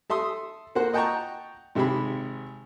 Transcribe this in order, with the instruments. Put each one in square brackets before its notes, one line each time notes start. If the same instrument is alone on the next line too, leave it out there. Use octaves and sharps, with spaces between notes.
[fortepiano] A4 E5 C6 D#6
A#3 F#4 C5 F#5
D#5 F#5 G5 A5 A#5 C#6
G#1 C3 G#3 G4 G#4 B5